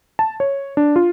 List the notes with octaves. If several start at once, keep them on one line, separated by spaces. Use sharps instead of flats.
A5
C#5
D4
F4